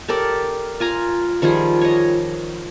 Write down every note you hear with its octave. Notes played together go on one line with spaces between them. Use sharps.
G4 A4 A#4 D5
F4 G#5 A#5
D#3 F3 G3 G#4
C#5 D#5